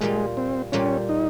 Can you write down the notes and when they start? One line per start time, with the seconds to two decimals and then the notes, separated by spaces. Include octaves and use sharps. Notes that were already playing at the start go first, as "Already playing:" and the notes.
0.01 A#2 G3 G#3 A#3 F4
0.37 C4
0.72 A#2 G3 A#3 C#4 F4
1.09 D#4